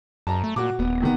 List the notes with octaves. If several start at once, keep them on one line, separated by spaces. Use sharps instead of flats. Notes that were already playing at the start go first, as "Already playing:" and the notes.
F#2 A5 A#5
A3
A#2 F#4 D6
D#1 B3
C3 D#3 B3